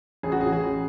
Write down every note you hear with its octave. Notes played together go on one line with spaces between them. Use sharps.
A1 G#4
F#4
G#4
F#4
A1 G#4